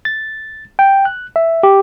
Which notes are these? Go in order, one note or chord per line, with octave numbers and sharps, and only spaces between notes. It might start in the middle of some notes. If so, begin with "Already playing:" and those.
A6
G5
F#6
E5
G4